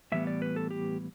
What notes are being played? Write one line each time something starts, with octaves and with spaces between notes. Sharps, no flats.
A2 E3 G3 B3 E5
D5
B4
A4
G4